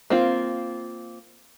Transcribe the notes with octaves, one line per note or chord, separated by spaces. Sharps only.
A#3 C4 F4